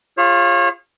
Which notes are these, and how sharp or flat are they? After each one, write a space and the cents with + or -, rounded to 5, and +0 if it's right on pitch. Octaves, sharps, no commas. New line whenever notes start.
F4 -5 G#4 -30 C#5 -35